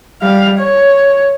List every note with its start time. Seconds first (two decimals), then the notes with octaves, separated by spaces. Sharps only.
0.22 G3 F5
0.58 C#5